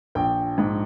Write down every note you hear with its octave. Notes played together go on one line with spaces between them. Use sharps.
A#1 G5
G#2